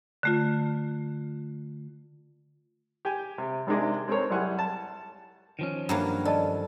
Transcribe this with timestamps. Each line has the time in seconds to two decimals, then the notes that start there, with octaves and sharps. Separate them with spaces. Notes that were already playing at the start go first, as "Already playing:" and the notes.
0.23 D3 A3 F4
3.05 G4 G5 G#5
3.38 C3
3.67 G#1 C3 D#3 G#3 D4
4.08 G#3 C4 A4 A#4 C#5
4.30 F#2 G3 E4 C5 F#5 G#5
4.59 A5
5.59 D#3 F3 C#4
5.89 G2 F#3 A#3
6.25 A4 D5 D#5 A5